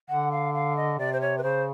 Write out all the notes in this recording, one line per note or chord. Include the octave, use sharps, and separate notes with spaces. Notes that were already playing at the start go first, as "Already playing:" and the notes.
D3 F#5
F5
F5
D#5
C3 D5
C5
C#5
B4
C#3 C5